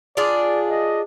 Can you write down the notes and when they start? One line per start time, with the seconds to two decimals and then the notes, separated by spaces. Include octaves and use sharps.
0.17 D4 F4 G#4 D5
0.69 D#5